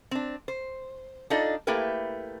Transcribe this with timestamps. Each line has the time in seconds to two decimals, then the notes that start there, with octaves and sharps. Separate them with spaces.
0.11 C4 D4
0.48 C5
1.30 D4 D#4 F4 A4 D5 D#5
1.67 A3 A#3 E4 G4 A#4 B4